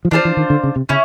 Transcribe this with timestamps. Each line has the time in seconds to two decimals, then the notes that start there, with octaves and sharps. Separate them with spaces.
0.05 F3
0.11 E3 D4 F4 A4 C5
0.25 E3
0.37 D#3
0.50 D3
0.63 C#3
0.76 C3
0.89 C#3 C#4 E4